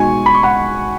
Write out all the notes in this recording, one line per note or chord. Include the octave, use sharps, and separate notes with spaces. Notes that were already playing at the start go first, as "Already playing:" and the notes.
Already playing: B2 G#3 D#4 G#5 C#6
B5
C#6
F#5 B5